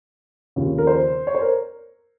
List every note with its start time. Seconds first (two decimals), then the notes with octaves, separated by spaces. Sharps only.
0.56 D#2 C#3 F3
0.78 A#4
0.87 C5
1.27 C#5
1.35 C5
1.41 A#4